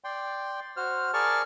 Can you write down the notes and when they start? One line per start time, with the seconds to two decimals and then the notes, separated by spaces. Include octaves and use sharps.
0.04 D5 G5 C6
0.77 F#4 C5 F6
1.14 G#4 A#4 D5 A5 C#6 F6